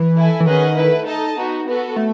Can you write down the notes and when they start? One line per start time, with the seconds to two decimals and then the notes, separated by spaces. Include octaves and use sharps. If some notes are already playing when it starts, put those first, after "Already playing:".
Already playing: E3
0.16 E4 A4 E5 G#5
0.40 E3
0.46 D#3 C#4 G#4 B4 D#5 F#5
0.77 A3 E4 B4
1.07 D#4 A4 D#5 A5
1.37 B3 D#4 F#4
1.67 B3 F#4 A4
1.96 A3